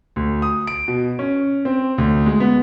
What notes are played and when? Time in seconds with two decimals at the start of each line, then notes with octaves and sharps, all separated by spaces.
0.16 D2
0.42 D#6
0.67 D7
0.88 B2
1.19 C#4
1.65 C4
1.98 D2
2.26 G#3
2.40 B3